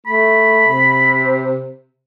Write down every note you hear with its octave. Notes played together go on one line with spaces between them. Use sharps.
A3 B5
C3